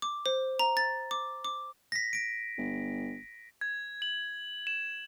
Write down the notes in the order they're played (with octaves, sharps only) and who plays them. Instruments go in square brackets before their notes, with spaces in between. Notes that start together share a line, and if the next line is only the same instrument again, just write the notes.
[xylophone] D6
C5
A#5
A6
D6
D6
[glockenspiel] A#6 B6
A#6 D7
[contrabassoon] G1
[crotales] G#6
F#7
E7